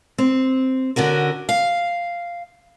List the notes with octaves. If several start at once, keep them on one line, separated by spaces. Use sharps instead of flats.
C4
D3 C#4 F#4 A#4
F5